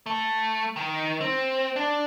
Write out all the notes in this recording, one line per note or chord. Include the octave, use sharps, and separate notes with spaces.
A3
D#3
C4
D4